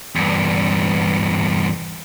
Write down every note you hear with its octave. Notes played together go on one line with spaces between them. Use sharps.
E2 G2